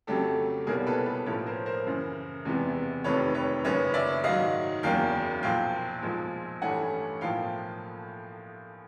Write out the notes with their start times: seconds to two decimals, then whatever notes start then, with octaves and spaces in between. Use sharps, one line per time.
0.07 F2 C#3 F#3 A3 G4 A4
0.67 C2 B2 G3 A#3 C#4 G#4 A#4
0.87 A4 B4
1.06 A4 B4
1.26 B1 A2 F3 A#3 C#4 B4 C#5
1.46 A#4 C5
1.66 A#4 C5
1.87 F#2 C#3 E3
2.45 E2 C3 E3 G#3 B3
3.04 F1 F2 C3 D#3 B4 C#5
3.34 B4 C#5
3.65 F#1 F#2 C#3 B4 C#5
3.94 D5 E5
4.24 G#2 D#3 F#3 D#5 F5
4.83 F#1 E2 C#3 F#3 A#3 F5 G5
5.43 B1 A#2 F3 F5 G5
6.02 B1 A#2 F3 G#3
6.62 A1 G2 E3 A3 C#4 F#5 G#5
7.21 B1 A2 F3 A#3 F5 G5